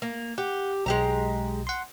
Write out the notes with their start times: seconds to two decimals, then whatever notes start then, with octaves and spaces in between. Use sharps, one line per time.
0.02 A#3
0.38 G4 F#5
0.86 B1 G#3 G4 A#5
1.67 F#5 C6